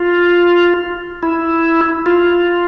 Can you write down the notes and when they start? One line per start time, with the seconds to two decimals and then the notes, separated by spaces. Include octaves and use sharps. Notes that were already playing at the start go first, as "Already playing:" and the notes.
Already playing: F4
1.23 E4
2.06 F4